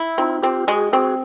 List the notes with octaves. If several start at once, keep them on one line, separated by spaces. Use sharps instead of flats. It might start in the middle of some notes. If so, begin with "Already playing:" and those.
Already playing: E4
C4 D#4 F4
C4 F4 G4
G#3 F#4 G#4
C4 F#4 G#4